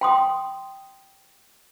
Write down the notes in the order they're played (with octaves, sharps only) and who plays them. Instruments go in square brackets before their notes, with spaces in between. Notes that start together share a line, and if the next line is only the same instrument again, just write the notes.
[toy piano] G5 C6 D#6